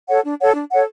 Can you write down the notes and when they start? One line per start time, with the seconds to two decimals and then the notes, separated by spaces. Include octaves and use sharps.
0.08 A4 C#5 F#5
0.23 D4
0.39 A4 C#5 F#5
0.55 D4
0.70 A4 C#5 F#5